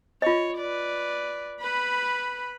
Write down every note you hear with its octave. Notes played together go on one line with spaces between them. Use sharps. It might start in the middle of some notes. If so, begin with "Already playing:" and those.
F4 C#5 D#5
B4 D5
B4 B5